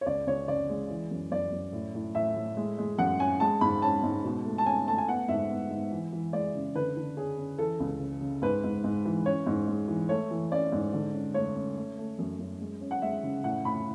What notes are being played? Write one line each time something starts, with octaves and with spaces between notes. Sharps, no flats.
C#5
C#2 D5
C#2 C#5
C#3 D5
G#3
E3
F#2
F#2 D5
F#2
A2
A2
A2 E5
A2
G#3
G#3
F#2 F#5
C#4 G#5
G#3 A5
G#2 B5
C#4 A5
G#2
B2
A3
A5
C#4 G#5
A3 A5
G#5
B3 F#5
G#2 E5
B3
G#2
E3
E3
G#3 D5
C#3
D3 B4
D3
C#4 G#4
C#4
E3 A4
C#2
C#3
C#3
G#2 B4
G#2
G#2
E3
C#4 C#5
G#2
G#3
E3
A3 C#5
E3
C#4 D5
G#2
D3
C#4
A3 C#5
C#4
A3
A3
F#2
F#2
G#3
C#4
F#5
G#3 E5
C#3
A2 F#5
A2 B5